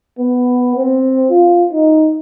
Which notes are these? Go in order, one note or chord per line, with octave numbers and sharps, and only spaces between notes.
B3
C4
F4
D#4